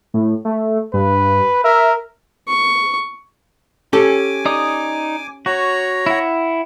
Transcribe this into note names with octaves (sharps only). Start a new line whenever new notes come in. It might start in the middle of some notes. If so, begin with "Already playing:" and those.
A2
A3
G2 B4
A#4 E5
C#6
C#4 G4 A4 G#5 D6
D#4 D5 D#6
F#4 C#5 A#5
E4 F#5